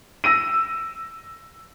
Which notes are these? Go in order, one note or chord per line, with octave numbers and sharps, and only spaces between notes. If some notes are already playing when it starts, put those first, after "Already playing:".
E6 A#6 D#7